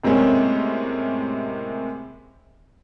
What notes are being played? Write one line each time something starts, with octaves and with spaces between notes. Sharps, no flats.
A2 C3 G#3 A#3 C4 C#4